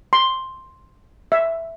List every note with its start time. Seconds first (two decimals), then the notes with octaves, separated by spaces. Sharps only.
0.13 C6
1.32 E5